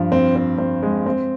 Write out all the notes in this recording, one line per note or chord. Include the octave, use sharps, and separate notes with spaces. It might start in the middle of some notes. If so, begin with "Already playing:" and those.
Already playing: G2 F3
C4
C4
C4
G#3
C4